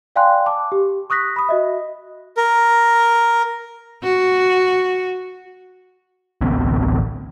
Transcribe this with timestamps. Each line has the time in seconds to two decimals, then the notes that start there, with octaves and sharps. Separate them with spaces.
0.16 D5 F5 G5 G#5 C6 F#6
0.46 A5 D6
0.72 G4
1.10 C#6 D#6 F#6 A#6 B6
1.36 B5 D#6
1.49 F#4 D#5 E5
2.37 A#4
4.03 F#4
6.41 A1 D2 B3 C4